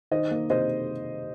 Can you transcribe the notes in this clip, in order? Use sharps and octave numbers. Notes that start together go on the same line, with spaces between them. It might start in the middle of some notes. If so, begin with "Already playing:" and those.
D#3 C5 D#5
A#3
C3 C5 D#5